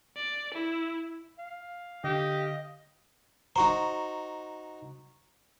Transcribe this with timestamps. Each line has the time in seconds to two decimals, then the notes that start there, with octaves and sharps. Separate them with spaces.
0.17 D5
0.54 E4
1.39 F5
2.04 D3 G4 D#5
3.56 D#4 F#4 C5 A#5 C#6